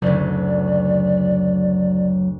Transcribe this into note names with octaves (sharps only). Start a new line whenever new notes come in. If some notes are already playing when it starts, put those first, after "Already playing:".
F#1 D2 F#3 D5